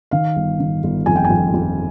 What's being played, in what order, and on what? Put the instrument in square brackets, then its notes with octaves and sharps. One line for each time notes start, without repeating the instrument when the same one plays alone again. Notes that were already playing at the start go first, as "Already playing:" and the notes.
[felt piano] D#3 F5
G1
D#3
G1
F2 G#5
G5
G#5
F2
F2